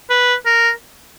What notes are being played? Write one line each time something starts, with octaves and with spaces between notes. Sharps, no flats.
B4
A#4